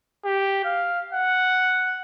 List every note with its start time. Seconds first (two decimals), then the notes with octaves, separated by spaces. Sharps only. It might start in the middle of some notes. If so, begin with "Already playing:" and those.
0.24 G4
0.64 F5
1.13 F#5